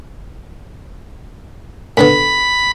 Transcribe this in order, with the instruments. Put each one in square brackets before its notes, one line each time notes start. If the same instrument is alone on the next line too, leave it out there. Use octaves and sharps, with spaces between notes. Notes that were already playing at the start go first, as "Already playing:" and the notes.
[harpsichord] A2 D3 B3 [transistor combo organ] B5